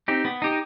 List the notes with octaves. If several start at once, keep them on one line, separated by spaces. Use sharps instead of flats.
C4 D#4 G4
B3
D#4 G4